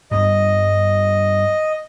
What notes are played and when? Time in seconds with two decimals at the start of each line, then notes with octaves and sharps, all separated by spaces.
0.11 G2 G3 B3 D#5